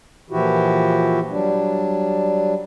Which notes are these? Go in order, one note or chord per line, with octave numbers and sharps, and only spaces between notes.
A#2 E3 F3 E4 F#4 G4
F#3 G3 D4